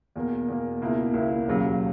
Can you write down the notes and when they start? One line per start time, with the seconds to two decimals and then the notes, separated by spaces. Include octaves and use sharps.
0.16 E2 B2 A#3
0.48 E2 B2 A#3
0.82 C#2 B2 A#3 E4
1.13 C#2 B2 A#3 E4
1.46 E1 D#2 C#3 F#3